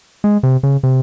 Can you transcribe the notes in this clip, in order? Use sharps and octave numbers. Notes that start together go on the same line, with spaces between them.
G#3
C3
C#3
C3